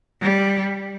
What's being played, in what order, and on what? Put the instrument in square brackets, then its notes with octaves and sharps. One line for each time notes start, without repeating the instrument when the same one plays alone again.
[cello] G3